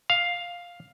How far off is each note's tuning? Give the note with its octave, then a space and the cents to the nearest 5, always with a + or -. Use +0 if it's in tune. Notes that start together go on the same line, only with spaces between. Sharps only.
F5 +5